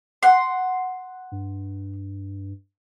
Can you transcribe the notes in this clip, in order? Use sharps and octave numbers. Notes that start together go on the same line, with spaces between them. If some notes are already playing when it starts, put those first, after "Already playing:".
F#5 C6
G2